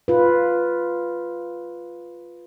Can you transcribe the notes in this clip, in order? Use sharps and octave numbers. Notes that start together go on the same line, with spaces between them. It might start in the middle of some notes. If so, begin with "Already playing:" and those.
F4 B4